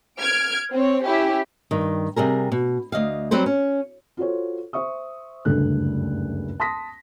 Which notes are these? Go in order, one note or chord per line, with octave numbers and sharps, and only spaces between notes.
F6 G#6 D7
C4 C#5
C#4 E4 G4
G2 D#3
C3 G3 G#4 A#4
B2
D2 F3 D#5 F5
F#3 G3 C4 F#4 B4 C5
C#4
F4 F#4 A4 C5 C#5
C5 E5 C#6 D#6
F#1 D2 G2 C#3 A3 F#6
A5 C6 D#6 A#6 B6